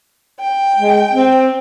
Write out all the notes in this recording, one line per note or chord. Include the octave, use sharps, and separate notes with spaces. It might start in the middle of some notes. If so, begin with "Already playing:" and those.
G5
G#3
C4